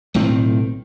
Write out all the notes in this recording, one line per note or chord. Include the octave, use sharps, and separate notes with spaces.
B1 A2 D#3 C4